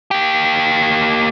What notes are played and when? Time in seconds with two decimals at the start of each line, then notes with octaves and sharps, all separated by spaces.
0.11 A#3 G4